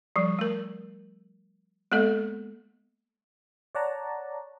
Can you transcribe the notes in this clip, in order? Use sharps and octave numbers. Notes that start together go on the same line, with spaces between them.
F3 G3
A3 A#4
G#3 A#3 B3 A4 D#5
C#5 D5 F#5 A5 A#5